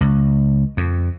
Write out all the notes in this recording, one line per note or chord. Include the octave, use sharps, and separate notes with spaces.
C#2
F2